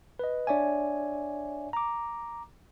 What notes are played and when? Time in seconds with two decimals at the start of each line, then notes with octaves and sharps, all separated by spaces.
0.19 B4 D#5
0.47 D4 C#5 D5 E5 G#5
1.73 A#5 D6